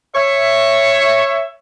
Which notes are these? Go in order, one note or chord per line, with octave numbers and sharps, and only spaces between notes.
C#5 E5